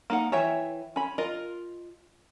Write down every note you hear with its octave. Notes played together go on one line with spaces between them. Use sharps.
A#3 D#4 F#5
E3 C#5 E5 G5
C#4 B5
F4 A#4 D#5